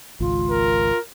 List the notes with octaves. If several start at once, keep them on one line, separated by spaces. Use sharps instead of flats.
G#1 C#2 F4
A#4